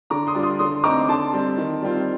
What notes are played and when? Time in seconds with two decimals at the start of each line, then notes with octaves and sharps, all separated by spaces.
0.10 D3 A#5 D6
0.27 C6 D#6
0.35 G3 D4 F4
0.43 C6 D#6
0.59 D3 C6 D#6
0.84 A3 C4 D#4 A#5 D6
1.09 D3 A5 C6
1.33 G3 C4
1.58 D#3
1.82 G3 C4 F4